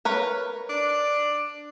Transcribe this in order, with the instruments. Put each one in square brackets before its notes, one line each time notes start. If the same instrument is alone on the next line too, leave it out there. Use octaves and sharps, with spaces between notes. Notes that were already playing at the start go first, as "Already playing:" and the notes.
[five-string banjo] A#4 B4 C#5
[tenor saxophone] D4